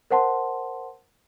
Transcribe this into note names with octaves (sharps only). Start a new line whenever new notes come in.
A#4 C5 F#5 A5 C6